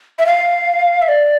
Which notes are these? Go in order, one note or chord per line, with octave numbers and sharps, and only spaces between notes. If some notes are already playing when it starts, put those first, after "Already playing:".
E5
F5
E5
D5